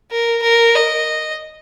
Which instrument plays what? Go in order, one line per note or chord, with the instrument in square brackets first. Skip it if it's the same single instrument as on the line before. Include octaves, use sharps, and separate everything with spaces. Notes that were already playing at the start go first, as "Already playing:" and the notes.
[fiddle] A#4
A#4
D#5